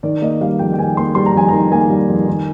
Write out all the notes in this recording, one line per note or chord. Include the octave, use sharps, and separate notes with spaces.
D#3 D5
A#3 D#5
G3 F5
F2 G5
G5
D#3 G#5
A#3 C6
G3 C6
A#5
F2 G#5
D#3 A#5
A#3 G#5
G3
F2
D#3